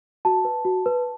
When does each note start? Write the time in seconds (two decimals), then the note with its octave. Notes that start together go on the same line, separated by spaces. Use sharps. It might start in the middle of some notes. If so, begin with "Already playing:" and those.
0.25 F#4 A5
0.45 B4
0.65 F#4
0.86 B4